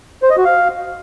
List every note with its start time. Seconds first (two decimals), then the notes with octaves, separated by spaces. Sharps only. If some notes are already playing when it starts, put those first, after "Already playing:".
0.23 C5
0.30 D#5
0.38 F#4
0.45 F5